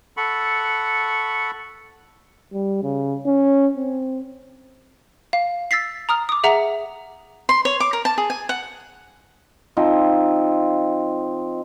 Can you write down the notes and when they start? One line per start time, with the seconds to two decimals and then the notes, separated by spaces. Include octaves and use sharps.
0.17 A4 F#5 B5 C#6
2.53 G3
2.83 C#3
3.26 C#4
3.76 C4
5.33 F5
5.71 E6 A6 B6 C7
6.09 A#5 D#6 F6
6.29 D6 D#6
6.44 G#4 E5 F#5 A#5 F7
7.49 C6
7.65 C#5
7.80 D6
7.93 A#4
8.05 A5
8.18 G#4
8.30 G#5
8.49 F#5
9.77 F3 C4 D#4